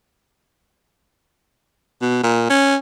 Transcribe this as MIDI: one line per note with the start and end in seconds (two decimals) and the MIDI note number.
2.01 2.23 47
2.23 2.46 46
2.50 2.76 61